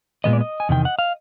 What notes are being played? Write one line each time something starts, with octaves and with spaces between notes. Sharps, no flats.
A#2 F3 G#3 B3 D#5
D5
D#5
G#5
E2 C3 D#3 G5
F#5
F5